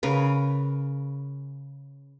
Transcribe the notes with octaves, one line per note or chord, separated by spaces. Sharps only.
C#3 A#4 B4